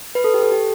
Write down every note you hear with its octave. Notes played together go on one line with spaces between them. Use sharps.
B4
A4
G4
A4
G4